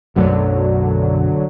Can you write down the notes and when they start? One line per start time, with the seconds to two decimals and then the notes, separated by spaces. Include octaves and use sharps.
0.16 B1 F#2 D3 F#3 A3